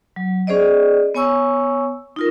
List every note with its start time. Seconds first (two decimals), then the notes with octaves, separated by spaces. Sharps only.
0.16 F#3
0.47 C#4 G#4 C5 D5 D#5
1.15 B3 C#5 G#5 C#6 E6
2.16 D#4 F4 A#4